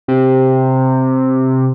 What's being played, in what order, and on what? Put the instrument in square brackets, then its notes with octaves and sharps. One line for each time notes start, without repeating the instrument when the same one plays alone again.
[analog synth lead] C3